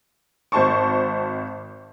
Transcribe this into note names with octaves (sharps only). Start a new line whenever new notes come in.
G#1 C5 A5 C#6